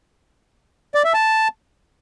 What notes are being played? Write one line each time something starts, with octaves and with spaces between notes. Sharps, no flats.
D5
E5
A5